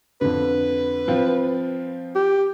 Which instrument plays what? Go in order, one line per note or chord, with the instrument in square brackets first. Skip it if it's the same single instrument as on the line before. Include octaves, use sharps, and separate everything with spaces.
[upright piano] F2 D3 [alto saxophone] B4
[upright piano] F3 C4 F4
[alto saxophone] G4